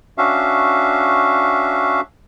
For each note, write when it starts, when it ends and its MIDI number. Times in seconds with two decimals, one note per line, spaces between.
0.18 2.01 61
0.18 2.01 62
0.18 2.01 66
0.18 2.01 76
0.18 2.01 77